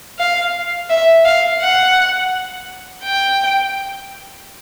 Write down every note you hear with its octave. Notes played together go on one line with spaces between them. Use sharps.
F5
E5
F5
F#5
G5